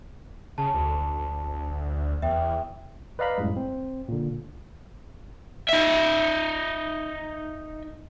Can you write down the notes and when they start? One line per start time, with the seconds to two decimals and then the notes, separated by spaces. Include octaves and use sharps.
0.58 C#3 A5
0.74 D2
2.22 E2 E5 G5
3.19 B4 D5 D#5 F5 A#5 B5
3.38 F#2 A2 G3 G#3
3.56 C4
4.08 A#2 D3
5.69 D#4 E5